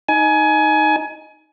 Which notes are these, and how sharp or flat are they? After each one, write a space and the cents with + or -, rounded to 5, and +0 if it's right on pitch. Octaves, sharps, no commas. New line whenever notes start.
D#4 +5 G#5 +25